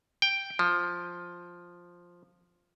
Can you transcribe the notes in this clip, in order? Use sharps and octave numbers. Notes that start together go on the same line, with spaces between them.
G5
F3